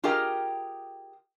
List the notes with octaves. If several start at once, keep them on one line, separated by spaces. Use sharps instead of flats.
F4 G4 G#4 A#4 D#5 G5